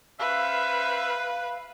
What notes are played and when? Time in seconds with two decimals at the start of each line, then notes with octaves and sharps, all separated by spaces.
0.20 C#4 B4 C5 E5 F5